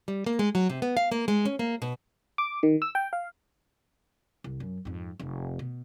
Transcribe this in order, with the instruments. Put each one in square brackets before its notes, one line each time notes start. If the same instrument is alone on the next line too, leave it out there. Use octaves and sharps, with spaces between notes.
[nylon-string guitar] G3
A#3
G#3
F#3
C3
B3
F5
A#3
G#3
C#4
A#3
B2
[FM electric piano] D6
D#3
E6
G5
F5
[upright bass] C2
F#2
F2 G#2
F1
B2